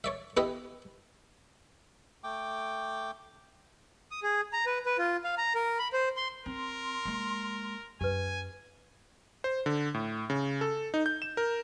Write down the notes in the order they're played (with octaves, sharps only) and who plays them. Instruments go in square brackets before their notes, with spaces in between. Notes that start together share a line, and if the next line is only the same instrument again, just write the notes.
[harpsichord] C#5 D5 E5
B3 E4 G4 D#5 E5
[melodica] A3 G5 D6
[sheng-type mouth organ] D#6
G#4
A#5
B4
B4
F4
F5
A#5
A#4
B5
C5
C6
[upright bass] C4 [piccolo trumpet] A#4 [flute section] C6
[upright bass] G#3 A#3
[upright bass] F#2 [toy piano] G4 B4 [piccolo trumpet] G#5
[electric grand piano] C5
D3
A2
C#3
A4
D#4
G6
E7
A#4